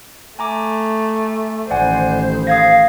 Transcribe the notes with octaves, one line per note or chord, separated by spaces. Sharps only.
A3 G#5 A#5 D6
A1 D#3 G3 C5 D5 F#5 G#5
F5 D#6 G#6 A#6